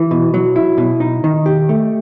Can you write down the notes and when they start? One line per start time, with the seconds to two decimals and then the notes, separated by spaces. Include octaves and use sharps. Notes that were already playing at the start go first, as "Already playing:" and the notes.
Already playing: E3
0.11 B2
0.34 F#3
0.56 E4
0.78 B2
1.00 D#4
1.24 D#3
1.46 G4
1.69 A3